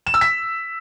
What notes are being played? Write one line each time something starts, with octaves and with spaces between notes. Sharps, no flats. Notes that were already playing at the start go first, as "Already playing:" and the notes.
E7
E6
B6